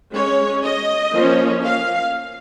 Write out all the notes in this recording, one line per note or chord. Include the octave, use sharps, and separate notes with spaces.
G#3 C#4 C#5
D#5
F3 A#3 C#4
F5